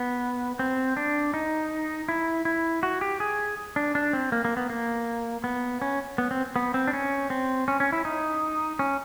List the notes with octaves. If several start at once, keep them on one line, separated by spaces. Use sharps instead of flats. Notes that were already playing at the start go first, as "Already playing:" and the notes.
Already playing: B3
C4
D4
D#4
E4
E4
F#4
G4
G#4
D4
D4
C4
A#3
A#3
B3
A#3
B3
C#4
B3
C4
B3
C4
D4
C#4
C4
C#4
C#4
E4
D#4
C#4